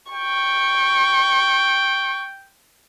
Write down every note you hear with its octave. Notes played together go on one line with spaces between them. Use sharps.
G5 C#6